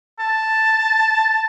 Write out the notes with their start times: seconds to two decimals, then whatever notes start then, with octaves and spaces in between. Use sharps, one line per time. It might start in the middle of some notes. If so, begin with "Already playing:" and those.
0.20 A5